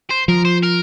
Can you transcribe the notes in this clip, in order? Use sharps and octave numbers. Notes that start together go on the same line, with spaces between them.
C5
F3 A#4
C5
A#4